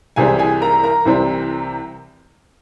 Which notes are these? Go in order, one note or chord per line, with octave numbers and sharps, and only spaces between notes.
C2 C3 E3 G3 C4 G#4 G#5
G#4 G#5
A#4 A#5
A#4 A#5
C2 C3 E3 G3 C4